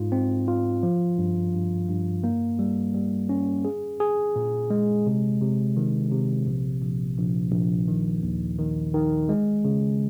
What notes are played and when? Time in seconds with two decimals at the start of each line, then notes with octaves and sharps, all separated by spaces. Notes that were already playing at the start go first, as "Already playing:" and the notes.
Already playing: G#2 F4
0.12 C4
0.48 F4
0.83 F3
1.18 G2
1.53 G2
1.89 G2
2.24 A#3
2.59 G3
2.94 G3
3.29 C#4
3.65 G#4
4.00 G#4
4.36 A#2
4.70 G#3
5.06 C3
5.41 C3
5.77 D#3
6.12 C3
6.47 A#1
6.82 A#1
7.18 A#1
7.52 A#1
7.88 D#3
8.23 D#2
8.58 D#3
8.94 D#3
9.29 G#3
9.65 C#3